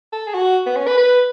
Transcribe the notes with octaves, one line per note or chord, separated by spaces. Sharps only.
A4
G#4
F#4
B3
C#4
B4
B4